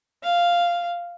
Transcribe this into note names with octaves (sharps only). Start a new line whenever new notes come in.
F5